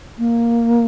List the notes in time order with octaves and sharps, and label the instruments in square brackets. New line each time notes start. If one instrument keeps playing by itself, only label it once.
[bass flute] A#3